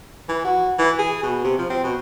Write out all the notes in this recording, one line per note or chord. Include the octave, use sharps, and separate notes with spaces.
E3
F#4
E3
G#4
B2
C3
F3
C4
B2